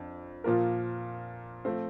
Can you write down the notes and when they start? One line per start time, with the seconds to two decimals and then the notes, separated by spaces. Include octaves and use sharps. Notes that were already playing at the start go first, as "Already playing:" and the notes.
Already playing: F2 D4
0.44 A#2 F3 A#3 F4 A#4
1.65 F3 A3 C4